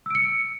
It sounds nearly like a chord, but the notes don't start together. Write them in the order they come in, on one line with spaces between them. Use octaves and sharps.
E6 D7 C#7